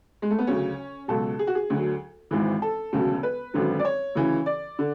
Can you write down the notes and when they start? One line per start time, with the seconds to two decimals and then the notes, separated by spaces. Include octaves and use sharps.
0.22 G#3
0.31 A3
0.39 B3
0.47 D2 C#3 F#3 C#4
1.08 C#2 B2 F#3 A4
1.39 G#4
1.47 F#4
1.55 G#4
1.70 D2 D3 F#3
2.31 G#1 G#2 E3
2.62 A4
2.93 E1 D2 C#3 F#3
3.23 B4
3.54 G#1 F#2 D3 F#3
3.79 D5
3.85 C#5
4.15 D2 C#3 E3
4.46 D5
4.79 D3